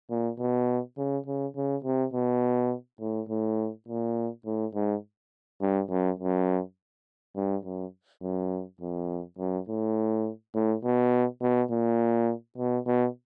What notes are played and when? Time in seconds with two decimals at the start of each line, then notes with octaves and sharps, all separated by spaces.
0.10 A#2
0.39 B2
0.97 C#3
1.26 C#3
1.56 C#3
1.84 C3
2.13 B2
3.01 A2
3.29 A2
3.88 A#2
4.46 A2
4.75 G#2
5.61 G2
5.90 F#2
6.19 F#2
7.36 G2
7.65 F#2
8.23 F#2
8.81 F2
9.38 F#2
9.68 A2
10.55 A2
10.84 B2
11.42 B2
11.71 A#2
12.58 B2
12.87 B2